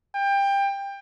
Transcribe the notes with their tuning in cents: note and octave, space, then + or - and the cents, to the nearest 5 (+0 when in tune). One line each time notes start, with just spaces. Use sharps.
G5 +20